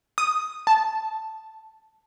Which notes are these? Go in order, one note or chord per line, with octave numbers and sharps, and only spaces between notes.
D#6
A5